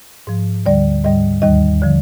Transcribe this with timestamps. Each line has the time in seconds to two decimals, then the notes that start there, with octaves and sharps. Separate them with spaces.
0.27 G#2 F3
0.66 D2 D3 G3 D5
1.04 G#2 G3 D#5
1.42 D#2 D#3 G3 D#5
1.82 D3 F3